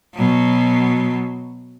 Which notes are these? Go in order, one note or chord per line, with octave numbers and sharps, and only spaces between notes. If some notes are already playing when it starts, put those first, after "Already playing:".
B2 F#3